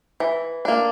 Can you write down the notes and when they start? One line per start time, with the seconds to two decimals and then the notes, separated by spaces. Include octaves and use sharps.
0.20 E3
0.65 A#3 D4